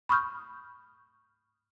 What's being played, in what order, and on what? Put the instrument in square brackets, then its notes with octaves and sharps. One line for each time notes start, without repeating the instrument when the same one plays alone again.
[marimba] B5 C#6 D#6 F6 G6